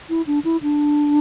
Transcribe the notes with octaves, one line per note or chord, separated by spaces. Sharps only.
E4
D4
E4
D4